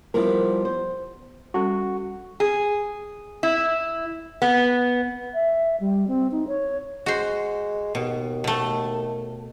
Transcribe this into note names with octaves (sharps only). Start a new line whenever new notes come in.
F3 G3 B3 E4 A#4
C5
G3 C#4 F#4 A4
G#4
E4
B3
E5
G3
C4
D#4
C#5
G#3 F#4 C5
D#2 B2
B2 A3